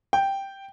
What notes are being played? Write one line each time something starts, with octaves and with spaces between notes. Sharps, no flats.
G5